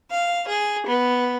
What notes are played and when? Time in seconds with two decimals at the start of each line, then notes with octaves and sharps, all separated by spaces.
0.10 F5
0.48 G#4
0.86 B3